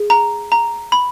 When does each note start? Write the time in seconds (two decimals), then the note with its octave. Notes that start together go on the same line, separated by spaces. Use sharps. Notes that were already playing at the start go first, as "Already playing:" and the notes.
Already playing: G#4
0.10 A#5
0.52 A#5
0.92 B5